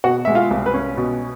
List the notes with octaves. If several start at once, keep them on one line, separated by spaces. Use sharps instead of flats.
B2 F#4 F#5
G#3 E5
F4 F5
C2
B4
C#4
B2